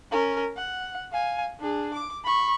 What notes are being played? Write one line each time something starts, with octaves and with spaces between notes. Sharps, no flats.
C#4 A#4
F#5
F5 G#5
D4 G#4
D6
B5 C#6